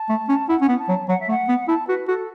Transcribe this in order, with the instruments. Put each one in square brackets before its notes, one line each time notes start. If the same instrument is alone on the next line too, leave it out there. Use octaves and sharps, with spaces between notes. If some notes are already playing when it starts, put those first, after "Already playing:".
Already playing: [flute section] A5
[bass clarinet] A3
C#4
[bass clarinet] E4 [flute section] F#5
[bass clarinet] C#4
B3
[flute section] A5
[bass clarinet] F#3
[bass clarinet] F#3 [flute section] F#5
[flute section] E5
[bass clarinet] A3 [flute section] F#5
[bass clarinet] B3
[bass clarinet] E4 [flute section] A5
[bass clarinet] F#4 [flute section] B4
[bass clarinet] F#4 [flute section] A4